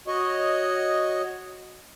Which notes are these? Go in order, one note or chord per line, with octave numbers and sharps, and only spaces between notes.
F#4 C#5 D#5